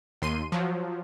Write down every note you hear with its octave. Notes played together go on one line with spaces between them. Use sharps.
D#2 C6 D#7
F3 F#3